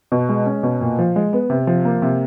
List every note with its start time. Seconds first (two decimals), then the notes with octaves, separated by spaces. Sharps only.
0.12 B2
0.29 G#3
0.46 C#4
0.63 B2
0.81 A#2
0.99 F3
1.16 G#3
1.33 B3
1.50 C3
1.67 F3
1.85 A#3
2.02 C3